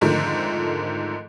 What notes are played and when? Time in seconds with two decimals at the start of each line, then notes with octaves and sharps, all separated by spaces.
0.01 F2 G#2 D3 D#3 F3 A3